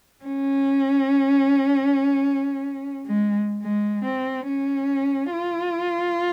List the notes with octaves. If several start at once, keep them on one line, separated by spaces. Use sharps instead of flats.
C#4
G#3
G#3
C4
C#4
F4